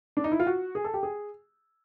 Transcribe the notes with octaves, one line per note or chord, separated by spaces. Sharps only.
D4
D#4
E4
F4
F#4
G#4
A4
G4
G#4